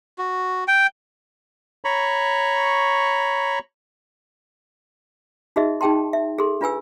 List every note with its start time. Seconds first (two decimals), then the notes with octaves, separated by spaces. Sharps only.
0.18 F#4
0.68 G5
1.85 C#5 A#5 B5 C#6
5.56 D#4 F#4 G#4 D#5 E5
5.81 D#4 G#4 G5 A5 C6
6.13 E5
6.38 G#4 A4 C6
6.61 D4 F4 B4 G#5 E6